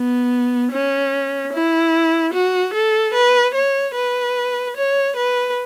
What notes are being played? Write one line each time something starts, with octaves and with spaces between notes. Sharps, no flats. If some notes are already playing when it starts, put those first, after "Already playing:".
Already playing: B3
C#4
E4
F#4
A4
B4
C#5
B4
C#5
B4